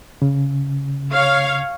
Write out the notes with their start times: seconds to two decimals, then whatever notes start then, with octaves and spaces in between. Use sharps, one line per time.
0.22 C#3
1.12 C#5 F5